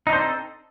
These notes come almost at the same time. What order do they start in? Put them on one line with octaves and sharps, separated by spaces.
D#4 D4 C5 C4 A4